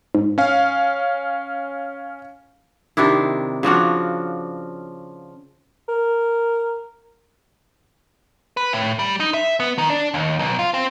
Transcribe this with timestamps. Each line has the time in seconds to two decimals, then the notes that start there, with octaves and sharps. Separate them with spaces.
0.15 G#2
0.38 C#4 F5
2.97 C3 D#3 D4 E4
3.63 C#3 F3 D4 F#4
5.88 A#4
8.57 B4
8.73 A2
8.99 G3
9.20 D#4
9.34 E5
9.60 B3
9.78 D#3
9.90 D4
10.14 D#2
10.39 B1
10.59 F4
10.74 C4